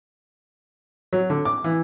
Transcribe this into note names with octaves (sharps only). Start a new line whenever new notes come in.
F#3
D3
D6
E3